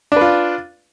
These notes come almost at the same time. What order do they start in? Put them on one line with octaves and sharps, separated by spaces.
D4 B4 F4